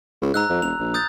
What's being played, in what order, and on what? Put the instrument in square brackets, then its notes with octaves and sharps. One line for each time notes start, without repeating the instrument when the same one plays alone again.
[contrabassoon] C#2
[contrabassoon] G#2 [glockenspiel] A#5 E6 F#6
[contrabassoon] F2
[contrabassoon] E1 [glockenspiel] F7
[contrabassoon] A#1
[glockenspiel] D#6 G6 A6